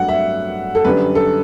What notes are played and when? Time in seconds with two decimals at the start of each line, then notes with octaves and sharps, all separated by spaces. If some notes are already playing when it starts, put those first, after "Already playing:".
Already playing: G2 F#3 A3 F#5
0.09 E5
0.75 A4
0.85 F#2 D3 G3 B4
1.15 A4